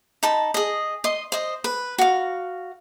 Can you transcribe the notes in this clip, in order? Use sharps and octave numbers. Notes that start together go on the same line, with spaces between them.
D#4 A5 B5
G#4 D#5
D#5 C6
C5 D#5
B4
F#4 F5